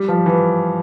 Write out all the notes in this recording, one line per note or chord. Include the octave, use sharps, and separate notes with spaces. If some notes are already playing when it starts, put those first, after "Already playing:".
Already playing: G3
F3
E3